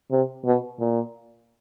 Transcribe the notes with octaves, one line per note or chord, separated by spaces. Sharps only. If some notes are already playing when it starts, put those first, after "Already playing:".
C3
B2
A#2